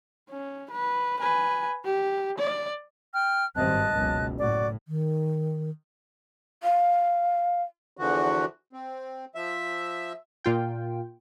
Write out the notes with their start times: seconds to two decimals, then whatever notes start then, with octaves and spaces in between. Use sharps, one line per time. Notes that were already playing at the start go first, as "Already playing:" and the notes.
0.29 C#4
0.71 B4
1.20 B4 G#5
1.85 G4
2.38 D5
3.14 G5 F6
3.56 G#1 G2 C4 D#5 A5 F#6
3.94 F#1 C#2 B2
4.38 A2 F#4 D5
4.88 D#3
6.63 F5
7.97 E2 D3 E3 F3 F#4
8.73 C4
9.35 F3 E5
10.44 A#2 F4 G5